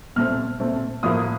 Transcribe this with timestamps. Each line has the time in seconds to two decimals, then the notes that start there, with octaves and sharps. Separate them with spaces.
0.16 A#2 A3 C4 F6
0.60 A#2 A3 C4
1.03 A2 F3 A#3 D#6